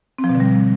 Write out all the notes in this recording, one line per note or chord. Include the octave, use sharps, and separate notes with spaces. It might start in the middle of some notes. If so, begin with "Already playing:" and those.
C4
F3
B2
D3
G3